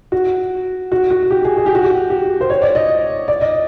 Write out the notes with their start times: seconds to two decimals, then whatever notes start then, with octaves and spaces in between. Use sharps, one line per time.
0.12 F#4
0.92 F#4
1.11 F#4
1.31 G4
1.45 G#4
1.58 G#4
1.66 G4
1.75 F#4
1.84 G4
2.10 G4
2.41 C5
2.50 C#5
2.62 D5
2.75 D#5
3.28 D5
3.41 D#5